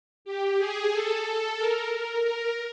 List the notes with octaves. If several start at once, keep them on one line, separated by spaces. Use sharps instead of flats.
G4
G#4
A4
A#4
A#4
A#4